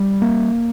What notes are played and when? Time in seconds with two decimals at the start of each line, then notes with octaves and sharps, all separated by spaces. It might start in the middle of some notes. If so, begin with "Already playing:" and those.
Already playing: G3
0.22 A#3